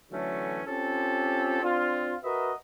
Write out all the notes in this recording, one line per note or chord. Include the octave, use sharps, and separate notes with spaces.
D3 E3 F#3 A3 C#4
C4 C#4 F4 G4 A4
C4 D4 F4
F#4 A#4 B4 D#5 E5